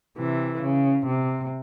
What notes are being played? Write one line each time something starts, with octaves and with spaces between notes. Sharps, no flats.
C3 E3
C#3
C3